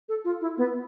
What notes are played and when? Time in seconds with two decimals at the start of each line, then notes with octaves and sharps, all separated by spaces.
0.09 A4
0.25 F4
0.41 E4
0.58 B3